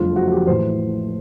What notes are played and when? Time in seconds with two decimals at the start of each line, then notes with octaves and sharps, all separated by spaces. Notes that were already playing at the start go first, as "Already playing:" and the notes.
Already playing: F#1 F2 D3 F3 G#3 F4
0.16 F#4
0.28 F#4
0.32 G4
0.47 A1 A2 E3 C5